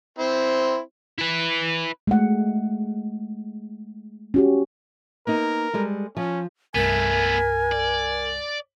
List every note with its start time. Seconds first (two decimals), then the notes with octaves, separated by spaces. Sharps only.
0.18 C4 E4 C5
1.19 E4 B4
2.07 G#3 A3 F#5
4.34 C#4 F#4 G4
5.27 A#3 B3 D#4 A#4
5.73 G3 G#3 A4
6.17 F3 C#4
6.75 C2 G2 A3 B3 A#4 G#5
7.71 D5